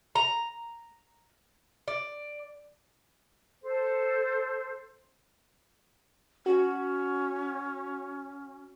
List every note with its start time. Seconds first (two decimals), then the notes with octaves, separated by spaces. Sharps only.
0.15 A#5
1.88 D5
3.64 A4 C5
6.46 C#4 F#4